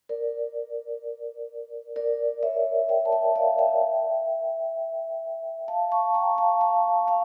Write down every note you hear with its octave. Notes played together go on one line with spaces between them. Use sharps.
A#4 D5
A#4 D5
C#5 E5
E5 G5
A5
E5 G5
D5 F5
E5 G5
F5 A5
A5 C#6
G5 A#5
F5 A5
F5 A5
F5 A5